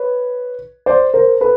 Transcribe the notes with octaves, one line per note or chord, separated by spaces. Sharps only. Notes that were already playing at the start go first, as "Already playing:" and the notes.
Already playing: B4 C#5
C5 D5
A#4 C5
A4 B4